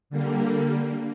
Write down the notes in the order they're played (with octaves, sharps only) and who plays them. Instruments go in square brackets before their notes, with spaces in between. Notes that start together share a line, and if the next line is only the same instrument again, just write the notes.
[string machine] D3 G3 A#3